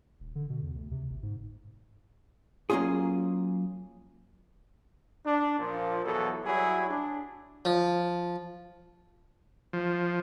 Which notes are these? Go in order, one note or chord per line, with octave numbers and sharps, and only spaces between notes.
D#1
D3
B2
E2
D2
C3
G1
G#2
F#3 A#3 B3 C#4 F4 G#4
D4
A#2 F3
E2 B2 F#3 A4
F#3 G3 E4 G#4
D4
F3
F3